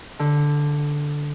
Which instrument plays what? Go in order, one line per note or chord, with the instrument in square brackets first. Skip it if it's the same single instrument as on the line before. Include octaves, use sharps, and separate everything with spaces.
[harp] D3